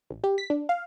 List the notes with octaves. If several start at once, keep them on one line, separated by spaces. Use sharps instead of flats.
A1
G4
B6
D4
F5